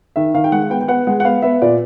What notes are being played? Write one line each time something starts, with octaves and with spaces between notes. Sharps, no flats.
D#3 E5
D#3 F5
G5
G#3 F#5
B3 G5
G5
B3 F#5
G#3 F#5
F#5
B3 F5
B3 E5
A#2 D5